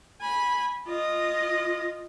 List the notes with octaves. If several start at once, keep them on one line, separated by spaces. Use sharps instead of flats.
G#5 B5
F4 D#5